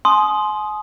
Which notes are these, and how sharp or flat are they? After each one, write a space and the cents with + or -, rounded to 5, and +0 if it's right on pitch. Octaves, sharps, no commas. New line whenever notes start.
G#5 +40 C6 +0 D#6 +0